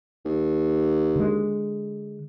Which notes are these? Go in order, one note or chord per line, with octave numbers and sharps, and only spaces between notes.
D#2
D3 G#3